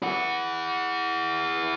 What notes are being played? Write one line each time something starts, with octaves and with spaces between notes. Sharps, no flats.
E4 F#5